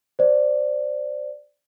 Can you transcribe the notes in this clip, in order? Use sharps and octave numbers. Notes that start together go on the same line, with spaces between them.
C5 D5